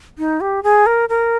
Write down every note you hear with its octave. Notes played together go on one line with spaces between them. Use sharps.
D#4
G4
G#4
A#4
A#4